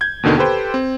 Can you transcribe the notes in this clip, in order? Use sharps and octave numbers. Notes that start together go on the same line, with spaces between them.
G6 G#6
D#2 B2 D3 D#3 B3
G4 A4 B4 C5 G5
C4